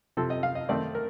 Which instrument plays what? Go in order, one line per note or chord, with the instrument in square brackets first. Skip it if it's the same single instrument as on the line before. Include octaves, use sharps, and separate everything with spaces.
[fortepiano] C3 F3 C4 A4
D#5
F5
D#5
D#3 A3 C4 D5
A#4